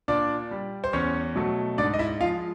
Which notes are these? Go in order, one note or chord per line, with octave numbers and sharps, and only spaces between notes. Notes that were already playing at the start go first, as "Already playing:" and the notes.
A#2 D4 D5
G3
C5
E2 C#4 C#5
B2 F#3 A3
G#2 D4 D5
D#5
E4 E5
F3 G#3 F4 F5